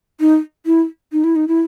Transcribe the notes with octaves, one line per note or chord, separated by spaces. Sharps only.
D#4
E4
D#4
E4
D#4
E4